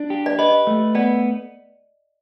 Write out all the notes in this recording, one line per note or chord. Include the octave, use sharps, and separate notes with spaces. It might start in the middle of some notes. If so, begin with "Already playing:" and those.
Already playing: D4
G4
D5
B4 D#5
A3
B3 D5